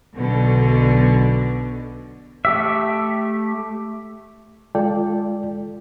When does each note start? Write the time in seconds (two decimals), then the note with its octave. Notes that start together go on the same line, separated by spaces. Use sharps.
0.14 B1 B2 D3
2.45 A3 G4 E5
4.75 G#3 F4 A4 D5 G5